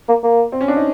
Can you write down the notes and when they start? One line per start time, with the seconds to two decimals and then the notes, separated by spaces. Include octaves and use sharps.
0.09 A#3
0.24 A#3
0.52 C4
0.61 C#4
0.68 D4
0.76 D#4